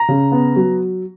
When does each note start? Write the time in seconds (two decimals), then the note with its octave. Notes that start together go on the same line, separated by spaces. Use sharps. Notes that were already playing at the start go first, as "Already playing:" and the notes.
Already playing: A#5
0.08 C#3
0.32 B3
0.56 F#3